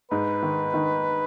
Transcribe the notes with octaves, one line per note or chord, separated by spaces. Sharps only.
G#2 B4
D#3
D#3